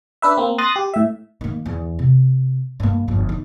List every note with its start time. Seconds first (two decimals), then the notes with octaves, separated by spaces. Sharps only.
0.22 D4 B4 E5
0.37 A#3 C4
0.58 C6 D#6 F#6 A6 A#6
0.76 G4
0.94 A2 E5
1.41 D#3 A#3
1.66 E2
1.99 C3
2.80 G2 A#3
3.08 G1 F2
3.29 D#4